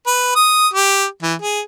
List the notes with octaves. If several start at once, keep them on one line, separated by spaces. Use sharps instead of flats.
B4
D#6
G4
E3
G#4